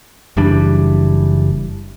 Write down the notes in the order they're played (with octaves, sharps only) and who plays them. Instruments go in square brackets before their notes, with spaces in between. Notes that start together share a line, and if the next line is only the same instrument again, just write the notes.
[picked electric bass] F#1 E3 G3 D4